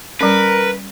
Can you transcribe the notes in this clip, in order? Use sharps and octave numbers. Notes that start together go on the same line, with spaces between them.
G3 C#4 A#4 B4